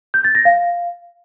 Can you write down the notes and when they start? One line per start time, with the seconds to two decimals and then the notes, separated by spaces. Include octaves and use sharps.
0.14 G6
0.24 A6
0.35 A#6
0.45 F5